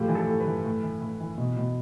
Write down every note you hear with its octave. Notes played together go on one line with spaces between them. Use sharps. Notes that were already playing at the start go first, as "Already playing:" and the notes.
Already playing: A2 F3 G4
E3
A4
A2
B4
E3
A2
E3
A2
E3
B2
B2